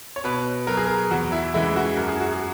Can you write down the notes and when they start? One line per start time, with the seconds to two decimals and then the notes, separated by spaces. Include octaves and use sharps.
0.16 C#5
0.24 B2 B4
0.67 F#3 A#4
0.77 G#4
0.86 A#4
1.11 E2 F#4
1.32 E4
1.54 C#3 E3 G#3 E4
1.76 F#4
1.97 F#2 A#4
2.08 G#4
2.20 F#4
2.32 G#4